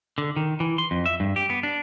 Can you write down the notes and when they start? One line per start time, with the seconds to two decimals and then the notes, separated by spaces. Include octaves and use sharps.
0.18 D3
0.36 D#3
0.60 E3
0.78 C6
0.91 F2
1.06 E5
1.20 G2
1.36 G4
1.50 B3
1.63 D4